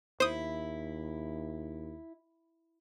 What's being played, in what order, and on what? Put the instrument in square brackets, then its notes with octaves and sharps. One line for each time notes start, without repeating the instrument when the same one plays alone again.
[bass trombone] D#2 [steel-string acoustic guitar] E4 [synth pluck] C5 D#6